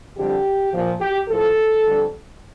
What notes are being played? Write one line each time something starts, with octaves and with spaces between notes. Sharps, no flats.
F2 D3 G3 G4
A#2 F3
G4
A2 F3 A4
F2 D3 G3